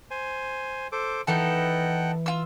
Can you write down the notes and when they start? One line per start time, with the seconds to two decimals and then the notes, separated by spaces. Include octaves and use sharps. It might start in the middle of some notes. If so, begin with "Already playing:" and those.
0.11 C5 G#5
0.92 A4 C5 D6
1.27 E3 B3 D#4 A4 F#5 G5
2.26 F4 E6